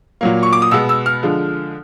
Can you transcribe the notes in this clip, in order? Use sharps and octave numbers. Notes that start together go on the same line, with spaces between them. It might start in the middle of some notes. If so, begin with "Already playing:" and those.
A#2 F#3 A#3
C#6
D6
D#6
B2 G#3 B3 E6
E6
F6
D3 F3 G#3